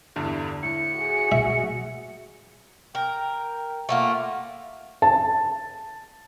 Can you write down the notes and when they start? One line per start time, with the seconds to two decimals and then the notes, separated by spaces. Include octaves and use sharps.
0.16 E2 G2 D3
0.63 A2 C#7
0.97 F#4 G#4
1.32 E5
2.95 A#4 G5
3.89 A3 A#3 F4 F#5
5.02 A5